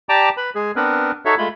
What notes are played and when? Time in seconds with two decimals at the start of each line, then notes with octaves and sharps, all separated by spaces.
0.09 G4 D5 G5 A5 A#5 D6
0.37 B4 B5
0.55 G#3 G#4
0.76 B3 C4 D4 A#4 B4
1.25 D#4 F#4 A4 C#5 E5
1.38 G#3 A3 F4 B5